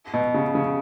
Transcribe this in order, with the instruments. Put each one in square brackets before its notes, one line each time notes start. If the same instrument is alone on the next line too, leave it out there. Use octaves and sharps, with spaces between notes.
[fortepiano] B2
C#3
C#3